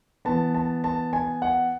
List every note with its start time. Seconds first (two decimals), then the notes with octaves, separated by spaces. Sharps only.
0.25 E3 B3 A5
0.54 A5
0.84 A5
1.13 G#5
1.42 F#5